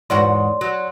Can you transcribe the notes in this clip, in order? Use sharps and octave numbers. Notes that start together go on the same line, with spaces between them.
E2 G#2 F#4 C#5 D5 C6
F#3